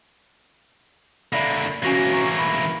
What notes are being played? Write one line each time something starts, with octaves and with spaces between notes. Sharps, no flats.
D3 A#3 D5 E5 B5
E3 A#3 C#4 F#4 A#6
A#5 C#6
B5